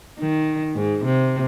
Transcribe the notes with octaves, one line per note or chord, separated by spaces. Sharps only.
D#3
G#2
C3